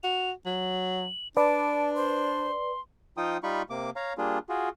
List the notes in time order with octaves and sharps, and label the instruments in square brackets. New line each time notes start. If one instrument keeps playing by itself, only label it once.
[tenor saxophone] F#4 [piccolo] F7
[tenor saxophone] F#3 [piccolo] F#7
[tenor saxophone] D4 [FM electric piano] B4 D5 [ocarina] A5 [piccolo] D7
[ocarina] C5 [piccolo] C6
[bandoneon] F3 D#4 F4 G5 D#6
G3 D#4 F4 B5 C#6
C3 A#3 D6
C#5 F5 A#5
G3 A#3 D4 F4 G#4
F4 F#4 G#4